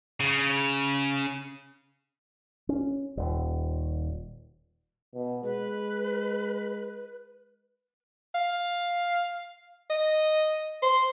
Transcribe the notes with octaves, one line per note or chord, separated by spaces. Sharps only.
C#3
C#4
D#1
B2
G#3 B4
F5
D#5
C5